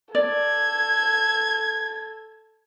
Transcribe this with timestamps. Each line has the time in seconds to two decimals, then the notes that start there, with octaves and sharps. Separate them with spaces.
0.15 A4 D5 G#6